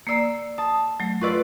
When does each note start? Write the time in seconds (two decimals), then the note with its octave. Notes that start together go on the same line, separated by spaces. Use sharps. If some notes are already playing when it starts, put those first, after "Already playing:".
0.07 A#3 D5 A#5 E6 C7
0.58 A5 D#6
1.00 F#3 A3
1.21 F4 B4 D5 C#6 E6